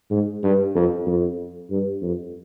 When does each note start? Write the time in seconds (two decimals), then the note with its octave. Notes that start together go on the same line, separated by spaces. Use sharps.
0.11 G#2
0.43 G2
0.75 F2
1.06 F2
1.71 G2
2.02 F2